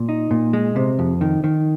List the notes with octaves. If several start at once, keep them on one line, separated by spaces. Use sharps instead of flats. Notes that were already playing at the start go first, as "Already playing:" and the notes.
Already playing: A#2
D#4
A#2
G#3
C3
F2
D#3
D#3